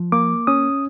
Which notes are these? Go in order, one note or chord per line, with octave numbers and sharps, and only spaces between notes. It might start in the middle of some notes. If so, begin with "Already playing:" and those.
Already playing: F3
A#3 D6
C#4 D#6